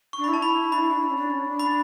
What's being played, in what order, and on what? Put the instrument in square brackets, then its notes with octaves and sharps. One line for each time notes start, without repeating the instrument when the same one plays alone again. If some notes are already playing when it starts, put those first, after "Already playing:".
[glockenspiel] C#6
[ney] D4
[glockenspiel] B5
[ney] E4
[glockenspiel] A5
B5
[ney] D4 [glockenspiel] B5
[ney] E4
D4
D4
C#4
D4
C#4
D4
[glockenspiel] B5